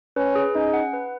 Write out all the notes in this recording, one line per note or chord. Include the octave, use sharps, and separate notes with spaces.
C#4 B4
G#4
C#4 D#4
F#5
B4